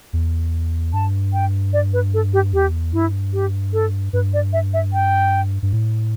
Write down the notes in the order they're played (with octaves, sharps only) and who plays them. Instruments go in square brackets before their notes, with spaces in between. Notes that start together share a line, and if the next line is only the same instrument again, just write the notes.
[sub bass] E2
[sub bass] G2 [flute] A5
[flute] G5
D5
B4
A4
G4
[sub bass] E2 [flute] G4
[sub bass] G2 [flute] E4
[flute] G4
A4
[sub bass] G2 [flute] B4
[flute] D5
E5
E5
G5
[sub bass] G2
A2